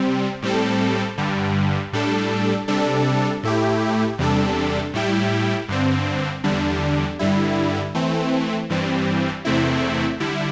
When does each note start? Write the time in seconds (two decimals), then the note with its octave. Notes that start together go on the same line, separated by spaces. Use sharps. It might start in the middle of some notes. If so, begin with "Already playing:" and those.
Already playing: C3 G3 C4
0.42 A2 G3 C4 A4
1.18 G2 D3 G3
1.93 A2 G3 D4 A4
2.68 C3 G3 D4 A4
3.43 A2 A3 E4 G4
4.18 E2 C3 G3 D4 A4
4.93 A2 G3 E4 G4
5.68 G2 D3 C4
6.44 E2 D3 G3 D4
7.19 G2 D3 G3 E4
7.95 E3 A3 C4
8.70 G2 E3 G3 C4
9.45 E2 C3 A3 C4 E4
10.20 D3 G3 E4